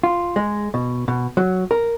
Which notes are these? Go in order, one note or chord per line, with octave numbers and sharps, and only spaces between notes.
F4
G#3
B2
B2
F#3
A#4